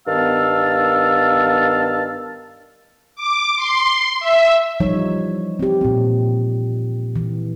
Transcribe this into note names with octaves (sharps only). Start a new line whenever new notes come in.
G2 D#3 B3 F5 A5 E6
D6
C6
E5
E3 F3 G3 D#4 C#5
C4 G4
A#2 C4
E3